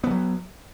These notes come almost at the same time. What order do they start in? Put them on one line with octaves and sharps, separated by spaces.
B3 F3 F#3